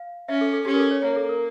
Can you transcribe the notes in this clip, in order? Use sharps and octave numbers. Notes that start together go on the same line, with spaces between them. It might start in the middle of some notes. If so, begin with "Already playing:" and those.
Already playing: F5
C#4 E5
A4
A4
C#4 G4
A#4
A4
C#5
A#3 C#5
A4
A#4